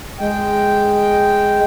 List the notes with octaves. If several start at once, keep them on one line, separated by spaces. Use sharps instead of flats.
G#3 G5